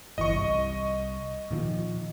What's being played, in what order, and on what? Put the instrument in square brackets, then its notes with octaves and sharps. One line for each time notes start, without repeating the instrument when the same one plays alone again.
[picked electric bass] G1 E3 [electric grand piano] D#5 C#6
[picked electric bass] C2
A#2 D#3 F3